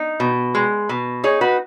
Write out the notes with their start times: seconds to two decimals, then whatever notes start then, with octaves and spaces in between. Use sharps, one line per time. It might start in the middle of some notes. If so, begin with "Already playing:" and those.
Already playing: D#4
0.20 B2
0.55 G#3
0.89 B2
1.24 D#4 G#4 C#5
1.41 F#4 B4